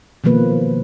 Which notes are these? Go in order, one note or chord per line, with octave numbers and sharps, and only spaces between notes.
B2 D#3 F3 A#3 B4